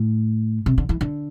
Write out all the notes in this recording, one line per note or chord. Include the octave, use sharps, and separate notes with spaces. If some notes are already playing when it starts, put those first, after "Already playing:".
Already playing: A2
C3
D3
E3
D3